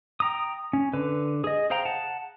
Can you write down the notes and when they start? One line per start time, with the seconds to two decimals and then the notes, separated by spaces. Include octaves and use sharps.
0.20 G5 A#5 D#6
0.73 C#4
0.93 D3 B4
1.44 G#4 D#5
1.70 G#4 C5 F5 G5 A#5
1.85 F#5 A5